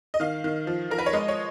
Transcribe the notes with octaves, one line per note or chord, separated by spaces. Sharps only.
D#5
D#3 F5
D#3
F3
F3 A#4
B4
C#5
G#3 D#5
C#5